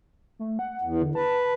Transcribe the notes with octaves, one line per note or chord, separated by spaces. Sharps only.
A3
F#5
E2
D3
B4 A5